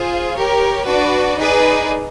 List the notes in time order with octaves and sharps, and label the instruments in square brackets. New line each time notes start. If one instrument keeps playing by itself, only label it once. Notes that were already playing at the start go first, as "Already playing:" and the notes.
Already playing: [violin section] F4 G#4 C5
G4 A#4 C#5
D4 F#4 B4 D5
D#4 G#4 B4 D5